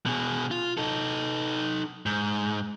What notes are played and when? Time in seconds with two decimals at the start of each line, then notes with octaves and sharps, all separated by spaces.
0.06 B2 G#4
0.51 F4
0.78 D#4 A4
2.06 G#2